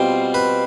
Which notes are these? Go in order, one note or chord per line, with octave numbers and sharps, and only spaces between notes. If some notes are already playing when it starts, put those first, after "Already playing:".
Already playing: B2 G3 C4 F4
B4